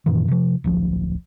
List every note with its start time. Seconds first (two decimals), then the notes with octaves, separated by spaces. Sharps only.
0.06 F#2 A#2 D#3 E3
0.28 C3 F3
0.64 D1 A#1 F3